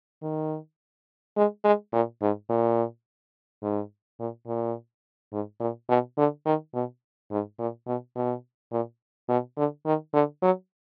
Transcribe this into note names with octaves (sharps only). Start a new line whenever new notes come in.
D#3
G#3
G#3
A#2
G#2
A#2
G#2
A#2
A#2
G#2
A#2
B2
D3
D#3
B2
G#2
A#2
B2
B2
A#2
B2
D3
D#3
D3
F#3